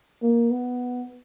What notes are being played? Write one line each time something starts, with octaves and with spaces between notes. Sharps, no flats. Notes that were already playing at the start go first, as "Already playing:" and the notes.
A#3
B3